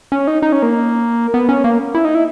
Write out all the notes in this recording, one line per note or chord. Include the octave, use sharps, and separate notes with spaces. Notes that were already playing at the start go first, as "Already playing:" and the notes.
C#4
D#4
D#4
C#4
A#3
B3
C#4
A#3
E4
D#4
E4